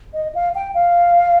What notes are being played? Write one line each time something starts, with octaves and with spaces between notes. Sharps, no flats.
D#5
F5
G5
F5